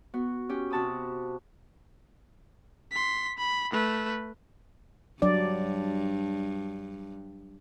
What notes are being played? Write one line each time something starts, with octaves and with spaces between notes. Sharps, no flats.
B3 F#4
C#4 G4
C3 F#4 A5 B5 D#6
C6 B6
B5
A3 B4
G2 F#3 D4 D5